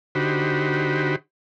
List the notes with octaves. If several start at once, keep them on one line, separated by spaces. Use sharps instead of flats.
D3 D#4 F#4 G4 C5 B5